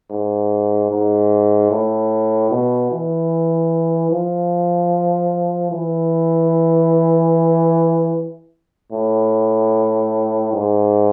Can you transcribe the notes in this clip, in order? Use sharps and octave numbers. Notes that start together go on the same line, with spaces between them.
G#2
G#2
A2
B2
E3
F3
E3
A2
G#2